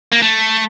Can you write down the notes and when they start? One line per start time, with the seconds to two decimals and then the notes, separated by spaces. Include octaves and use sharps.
0.12 A#3
0.22 A3